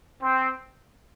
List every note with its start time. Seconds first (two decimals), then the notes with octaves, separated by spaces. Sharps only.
0.22 C4